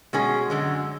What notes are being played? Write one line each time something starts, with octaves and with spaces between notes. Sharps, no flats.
B2 G#3 C#4 G#4
F#2 D3 G#3